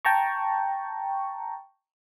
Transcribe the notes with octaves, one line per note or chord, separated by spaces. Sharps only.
G5 A5 A#5 C#6